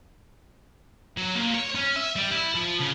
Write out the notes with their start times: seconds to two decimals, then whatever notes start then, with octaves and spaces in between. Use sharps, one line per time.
1.17 F#3
1.35 A#2
1.54 C#5
1.75 C#4
1.96 E5
2.16 G3
2.31 E4
2.55 F3
2.80 C#3